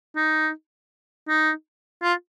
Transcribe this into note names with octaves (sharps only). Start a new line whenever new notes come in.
D#4
D#4
F4